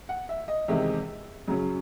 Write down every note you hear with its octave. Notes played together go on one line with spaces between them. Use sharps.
F#5
E5
D#5
E2 C3 D#3 G#3 E5
F#2 C#3 F#3 C#4